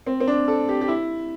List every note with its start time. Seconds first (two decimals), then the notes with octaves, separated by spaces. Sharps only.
0.06 C4
0.20 C4
0.27 D4
0.48 A4
0.69 G4
0.81 G4
0.88 E4